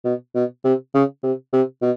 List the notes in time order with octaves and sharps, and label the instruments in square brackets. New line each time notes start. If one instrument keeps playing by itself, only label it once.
[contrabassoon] B2
B2
C3
C#3
C3
C3
B2